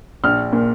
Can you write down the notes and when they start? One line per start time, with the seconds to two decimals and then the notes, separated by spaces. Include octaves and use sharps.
0.24 A#1 F6
0.53 A#2